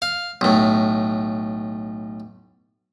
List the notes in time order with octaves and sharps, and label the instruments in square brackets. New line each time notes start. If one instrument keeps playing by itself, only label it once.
[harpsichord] F5
B1 A2